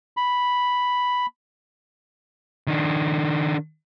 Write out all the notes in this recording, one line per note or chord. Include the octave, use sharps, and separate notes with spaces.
B5
D#3 D4